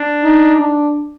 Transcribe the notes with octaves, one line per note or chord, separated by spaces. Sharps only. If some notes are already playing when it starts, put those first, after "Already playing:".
Already playing: D4
D#4
D4